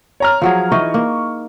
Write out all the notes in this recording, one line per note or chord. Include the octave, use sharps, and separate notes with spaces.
C#5 A#5 F6
F3 F#3 G#4
E3 D#4 D#5 C#6
A#3